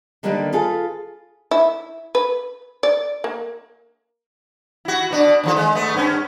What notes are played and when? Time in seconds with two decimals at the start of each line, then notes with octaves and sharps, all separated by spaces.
0.23 D3 D#3 G3 A#3 D4 B4
0.53 F4 G#4 A4 B4 F5
1.51 E4
2.15 B4
2.83 D5
3.24 A#3
4.85 E4 F#4
5.11 B2 D4
5.44 D#2 F3 A4
5.56 G#3
5.75 A3 B3
5.94 G2 C#4